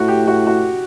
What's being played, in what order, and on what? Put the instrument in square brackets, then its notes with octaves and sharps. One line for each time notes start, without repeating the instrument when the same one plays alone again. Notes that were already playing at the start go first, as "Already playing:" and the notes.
Already playing: [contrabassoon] A2 [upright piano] F#4
[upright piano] G4
F#4
F#4